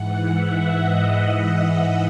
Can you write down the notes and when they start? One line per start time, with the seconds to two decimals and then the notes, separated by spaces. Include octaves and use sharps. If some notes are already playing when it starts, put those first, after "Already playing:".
Already playing: G#2 E3 F#5
0.32 E5
0.79 D#5
1.72 D#5